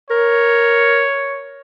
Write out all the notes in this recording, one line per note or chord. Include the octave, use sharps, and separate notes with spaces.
A#4 C#5